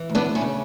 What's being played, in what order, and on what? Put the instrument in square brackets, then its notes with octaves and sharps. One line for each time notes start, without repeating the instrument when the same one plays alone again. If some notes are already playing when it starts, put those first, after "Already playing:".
Already playing: [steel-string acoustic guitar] E3
D2
B3 D4
D2
C#4 E4
C#3